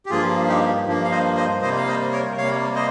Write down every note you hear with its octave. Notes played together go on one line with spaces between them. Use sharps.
G4
G2 F3 A#3 F4 G#4
D#4 G4
G2 F3 A#3
F5
C5 D#5
C5 D#5
C3 G3 A#3 C5 D#5
F5
C5 D#5
A#4 C#5
C3 G3 A#3 C#5 F5
C5 D#5